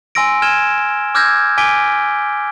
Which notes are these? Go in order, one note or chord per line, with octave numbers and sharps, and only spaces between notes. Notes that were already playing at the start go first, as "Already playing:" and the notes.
G#5 C6 E6 A#6 D7
G#5 F6 G#6 E7 G7
D6 E6 F6 G6 G#6 A#6
G#5 D6 B6 D7 G7